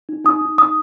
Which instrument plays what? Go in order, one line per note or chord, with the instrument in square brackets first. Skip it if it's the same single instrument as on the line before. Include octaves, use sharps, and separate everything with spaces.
[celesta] D#4
D#4 D#6
D#4
D#4 D#6